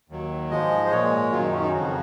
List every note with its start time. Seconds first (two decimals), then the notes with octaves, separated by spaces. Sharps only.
0.09 D#2 D#3 F#3
0.50 G#2 F3 G#3 D#5
0.86 C5
0.91 A#2 G#3 C#5
1.32 F#2 D#3 F#3 F4
1.43 D#4
1.52 C#4
1.62 D#4
1.73 F2 C#3 F3 F#4